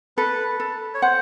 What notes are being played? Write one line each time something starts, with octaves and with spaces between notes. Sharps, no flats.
A4 B4
A4
C#5
C5 F#5